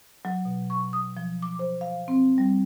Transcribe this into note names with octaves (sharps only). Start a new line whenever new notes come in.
F#3
B2
C#6
D#6
F3
D6
C5
F5
C4
G3